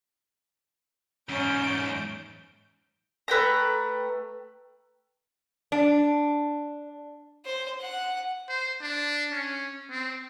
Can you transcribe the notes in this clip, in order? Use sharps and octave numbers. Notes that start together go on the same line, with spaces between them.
E2 G#2 C#4 G6 D7
A3 B4 G5 A#5
D4
C5
F#5
C5
D4
C#4
C4